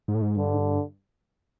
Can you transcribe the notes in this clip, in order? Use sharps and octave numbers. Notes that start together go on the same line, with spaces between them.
G#2
A2
G#2
G2 D3
G#2
G2